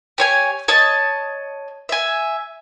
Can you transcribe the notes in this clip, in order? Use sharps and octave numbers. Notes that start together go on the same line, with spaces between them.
G4 C#5 G#5
C#5 D#5 A5
E5 G#5